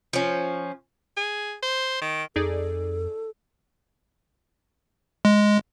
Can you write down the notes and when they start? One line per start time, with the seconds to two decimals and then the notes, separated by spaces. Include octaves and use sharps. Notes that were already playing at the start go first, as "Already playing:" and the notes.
0.13 F3 C#4
1.17 G#4
1.62 C5
2.01 D#3
2.36 F2 D#4 G#4 A4 D5
5.25 G#3